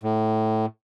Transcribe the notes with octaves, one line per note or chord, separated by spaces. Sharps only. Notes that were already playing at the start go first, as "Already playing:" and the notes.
A2